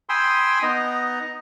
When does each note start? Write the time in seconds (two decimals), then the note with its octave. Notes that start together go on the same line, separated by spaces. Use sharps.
0.09 G5 G#5 B5 C6 D#6 E6
0.63 B3 D#4 D#5 A#5